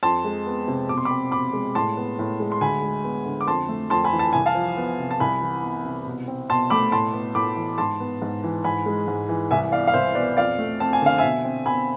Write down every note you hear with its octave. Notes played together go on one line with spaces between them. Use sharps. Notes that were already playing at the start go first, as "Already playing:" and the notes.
F2 A5 C6
G#3
B3
C3
B2 D6
C6
B5 D6
C4
B2 B5 D6
G#3
A2 A5 C6
B3
A2
G#3
C6
D2 G#5 B5
G#3
B3
D3
D6
F2 A5 C6
A3
F2 A5 C6
G#5 B5
E3
A5
C2 G#5
F5 A5
F3
B3
C3
A5
C2 G#5 B5
E3
B3
C3
B2
C4
B2 A5 C6
A3 B5 D6
A2 A5 C6
B3
A2 B5 D6
E3
G#2 A5 C6
B3
G#2
E3
G#2 G#5 B5
G#3
G#2
E3
C2 E5 G#5
B3 D5 F5
F5
C2 C5 E5
B2 B4 D5
F2 D5 F5
A3
C4 A5
G#5
D3 F5
B2 E5 G#5
C4
B2 G#5 B5